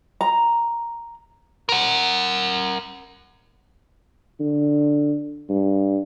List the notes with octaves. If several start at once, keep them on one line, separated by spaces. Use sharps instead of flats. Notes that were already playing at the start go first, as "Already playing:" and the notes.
A#5
A#4 F#5
D3
G2